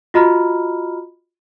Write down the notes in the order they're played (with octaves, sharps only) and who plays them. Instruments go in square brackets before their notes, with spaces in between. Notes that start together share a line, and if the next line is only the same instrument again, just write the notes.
[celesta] F4 F#4 D#5 A#5 B5 F6